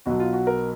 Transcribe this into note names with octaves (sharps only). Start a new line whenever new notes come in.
B1 B2 F#3 F#4
F4
F#4
A#4